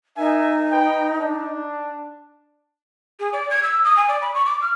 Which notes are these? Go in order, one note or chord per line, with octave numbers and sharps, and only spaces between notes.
D#4 A#4 E5 G#5
B4 G5
D4
G#4
D5
G#6
E6
D#6
G#5
D5
B5
C#6
D6
F6